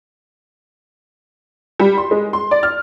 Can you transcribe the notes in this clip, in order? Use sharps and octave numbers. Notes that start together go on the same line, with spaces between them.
G3
C6
G#3
C6
D5
F6